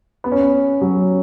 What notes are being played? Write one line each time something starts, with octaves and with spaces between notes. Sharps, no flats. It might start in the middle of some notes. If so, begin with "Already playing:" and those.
B3
C#4
B3
F#3